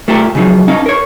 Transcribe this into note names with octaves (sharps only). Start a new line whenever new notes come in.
A3 F4 G4 A4 A#4
C#3 F3 F#3 D#4 F4
C#4 D#4 F5
A#4 C#5